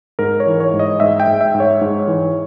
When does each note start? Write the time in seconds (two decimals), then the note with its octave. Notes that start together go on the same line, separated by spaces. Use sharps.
0.19 G#2 A#4
0.40 C#5
0.47 E3
0.60 C#5
0.73 G#2
0.79 D#5
1.00 G#2 E5
1.20 G5
1.27 G#2
1.41 E5
1.54 G#2
1.60 C#5
1.81 G#2
2.08 E3